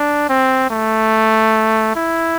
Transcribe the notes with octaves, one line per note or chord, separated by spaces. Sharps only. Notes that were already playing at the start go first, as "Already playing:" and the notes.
Already playing: D4
C4
A3
E4